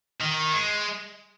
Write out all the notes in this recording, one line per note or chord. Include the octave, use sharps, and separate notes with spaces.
D#3
G#3